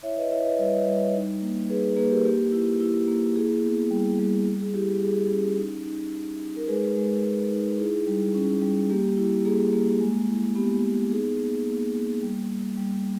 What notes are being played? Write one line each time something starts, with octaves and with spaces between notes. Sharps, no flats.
E4 C#5 E5
B4 D#5
E4 C#5 E5
B4 D#5
G3 B4 D#5
G3
D#4
A#3
D#4 G#4 B4
G#4
A#3 G#4 B4
G4 A#4
A#3 G4
E4
E4
A#3
E4 G#4
B3
G3
G3
G3
G#4
E4 G4
G4
G3 G#4
C#4
D#4
D#4
D#4
D#4
A#4
G#3 G#4 B4
G#3
G#3
D#4
E4 G#4
G3
C#4
G3
A#3 G4
E4 G4
A#3 G#4
A#3
G#3
E4
B3 G4
B3
D#4 G#4
A#3
A#3
A#3
G3
G3
G3